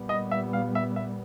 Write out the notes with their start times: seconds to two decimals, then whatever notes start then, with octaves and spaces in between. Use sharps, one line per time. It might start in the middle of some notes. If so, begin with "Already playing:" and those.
Already playing: A#2 G3 B3
0.09 D#5
0.31 E5
0.53 F5
0.75 E5
0.96 E5